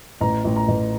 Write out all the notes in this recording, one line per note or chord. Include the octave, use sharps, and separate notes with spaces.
A1 A#5
A1
A#5
A1